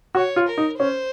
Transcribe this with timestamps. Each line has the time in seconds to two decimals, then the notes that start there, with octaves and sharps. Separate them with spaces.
0.15 F#4 C#5
0.36 F4
0.48 A#4
0.58 D#4
0.79 C#4 C5